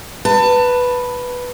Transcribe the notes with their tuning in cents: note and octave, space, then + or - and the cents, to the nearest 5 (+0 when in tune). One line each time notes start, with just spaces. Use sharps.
B4 +0 A5 +25